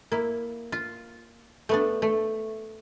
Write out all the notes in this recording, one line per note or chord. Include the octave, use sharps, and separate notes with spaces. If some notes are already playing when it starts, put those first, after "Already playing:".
A#3 E4
F4
A3 B3 D4
A3